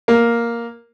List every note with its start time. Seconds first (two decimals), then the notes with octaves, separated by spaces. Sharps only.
0.08 A#3